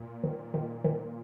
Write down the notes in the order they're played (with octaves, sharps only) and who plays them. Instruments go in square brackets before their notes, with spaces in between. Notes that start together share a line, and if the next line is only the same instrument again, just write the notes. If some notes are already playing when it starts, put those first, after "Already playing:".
Already playing: [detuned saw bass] A#2
[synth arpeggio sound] D#3
D#3
D#3